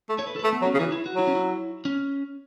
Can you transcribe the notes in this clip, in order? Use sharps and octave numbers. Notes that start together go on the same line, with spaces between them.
A3
C#5
B4
A4
B4
A3
B3
F#3
C#4
C#3
E3 F#4
E4
F#4
F#3 E4
C#4
E4
C#4